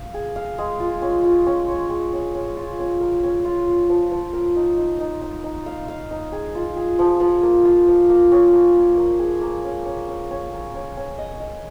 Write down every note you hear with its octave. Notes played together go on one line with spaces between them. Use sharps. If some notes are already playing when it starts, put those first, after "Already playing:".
Already playing: F5
G#4
F5
G#3
F4
C#4
F4
C#4
C#5
G#4
C#4
C#4
F4
C#4
A#4
C#4
F4
F4
F3
F3
A#4
D#4
D#4
D#4
D#4
D#4
F5
F5
D#4
G#4
F4
G#4
F3
F3
A#3
F4
F3
A#3
C#4
A#3
A#3
A#3
G#4
A#3
C#4
C#4
C#4
C#4
A#4
C#4
C#4
D#5
D#5